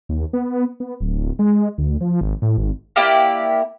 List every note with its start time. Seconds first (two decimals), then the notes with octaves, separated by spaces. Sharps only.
0.09 D#2
0.33 B3
0.80 B3
1.01 D1
1.39 G#3
1.78 D2
2.01 F3
2.21 G#1
2.42 A2
2.58 G#1
2.96 A#3 E4 G4 D5